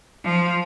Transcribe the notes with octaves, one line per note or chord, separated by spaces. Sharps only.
F3